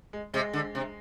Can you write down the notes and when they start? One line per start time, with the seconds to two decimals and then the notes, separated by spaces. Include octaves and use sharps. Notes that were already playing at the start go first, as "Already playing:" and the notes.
0.13 G#3
0.34 C3 G#3
0.53 D3
0.75 C3